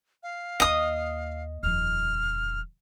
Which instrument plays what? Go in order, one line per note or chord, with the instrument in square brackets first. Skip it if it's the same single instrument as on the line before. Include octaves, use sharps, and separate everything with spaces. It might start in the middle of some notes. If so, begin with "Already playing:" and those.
[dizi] F5
[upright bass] D#2 A#3 [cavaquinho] D#5 D#6
[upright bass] D#1 F2 [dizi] F6